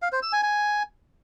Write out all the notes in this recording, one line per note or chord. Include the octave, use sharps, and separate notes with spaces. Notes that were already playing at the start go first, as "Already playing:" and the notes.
F5
C5
E6
G#5
G#5